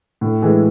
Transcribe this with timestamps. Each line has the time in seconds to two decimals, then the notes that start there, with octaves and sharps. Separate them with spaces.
0.21 A2
0.42 E3 G#3